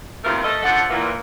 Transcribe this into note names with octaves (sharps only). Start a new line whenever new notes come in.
D#2 C3 E3 A3 F4 A#4
A3 A4 D#5
F3 D4 A4 F#5
A#2 E3 A#3